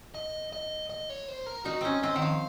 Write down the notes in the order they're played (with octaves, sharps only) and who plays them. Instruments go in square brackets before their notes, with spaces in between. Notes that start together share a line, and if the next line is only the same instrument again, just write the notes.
[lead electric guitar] D#5
D#5
D#5
C#5
C5
A#4
[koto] D#4 [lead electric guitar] F#4
[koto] C4 C#4 [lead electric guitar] D#5
[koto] C4 [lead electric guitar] D#5
[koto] D#3 [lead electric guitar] F#5
[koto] F3 [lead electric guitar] F5